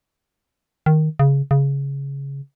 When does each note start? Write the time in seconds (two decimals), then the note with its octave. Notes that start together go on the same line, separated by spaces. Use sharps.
0.86 D#3
1.19 C#3
1.51 C#3